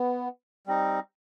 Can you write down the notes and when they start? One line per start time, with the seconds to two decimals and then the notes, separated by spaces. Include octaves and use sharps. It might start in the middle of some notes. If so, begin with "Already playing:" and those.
Already playing: B3
0.66 G3 C4 D#4